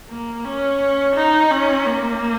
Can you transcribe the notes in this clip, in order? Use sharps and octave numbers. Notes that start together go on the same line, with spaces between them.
A#3
C#4
D#4
C#4
A#3